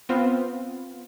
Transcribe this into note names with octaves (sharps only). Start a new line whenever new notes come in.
B3 C4 F4